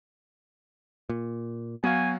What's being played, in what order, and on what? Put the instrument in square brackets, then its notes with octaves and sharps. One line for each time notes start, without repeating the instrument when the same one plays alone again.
[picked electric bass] A#2
[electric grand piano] F#3 F#4 F5 [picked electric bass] B3 [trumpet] G#5